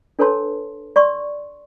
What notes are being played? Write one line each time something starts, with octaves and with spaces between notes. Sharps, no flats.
D4 A4 B4 C#5 A5 C6
D5 C6 C#6